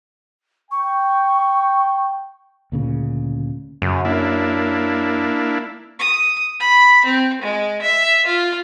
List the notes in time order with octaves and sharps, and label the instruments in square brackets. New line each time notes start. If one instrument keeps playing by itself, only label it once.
[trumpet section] G5 [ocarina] C#6
[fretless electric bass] D2 A#2 C#3
[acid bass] F#2 [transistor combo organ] C#3
[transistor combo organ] A#3 D4 E4
[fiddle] D#6
B5
C4
G#3
E5
F4